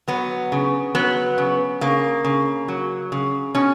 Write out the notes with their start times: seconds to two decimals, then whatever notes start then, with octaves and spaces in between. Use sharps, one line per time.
0.08 F#3 B3
0.52 C#3
0.95 F#3 B3
1.38 C#3
1.81 C#3 A#3
2.25 C#3
2.68 F#3
3.12 C#3
3.55 B2 C#4